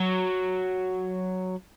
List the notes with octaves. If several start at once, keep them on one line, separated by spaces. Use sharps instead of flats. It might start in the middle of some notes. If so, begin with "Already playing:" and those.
Already playing: F#3